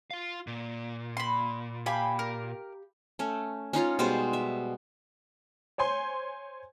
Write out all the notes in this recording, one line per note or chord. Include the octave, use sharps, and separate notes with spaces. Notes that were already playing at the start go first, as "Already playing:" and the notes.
F4 F5
A#2
B5 C6
G4 F5 G5 G#5 B5
A#4
A3 C#4
C#4 D#4 F4 C#5
B2 G3 G#3 C5
E5
C5 C#5 G#5 C6